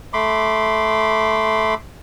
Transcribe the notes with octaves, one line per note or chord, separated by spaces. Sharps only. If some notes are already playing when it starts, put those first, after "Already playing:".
A3 B5 C6 D6